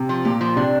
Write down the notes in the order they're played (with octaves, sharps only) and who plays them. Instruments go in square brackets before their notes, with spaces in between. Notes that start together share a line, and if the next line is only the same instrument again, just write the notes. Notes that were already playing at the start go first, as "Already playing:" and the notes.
Already playing: [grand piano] C3
[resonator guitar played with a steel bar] F3
[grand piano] A#2 [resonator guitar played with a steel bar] G4
[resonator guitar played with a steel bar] F3
[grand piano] C3 [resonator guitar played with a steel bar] D4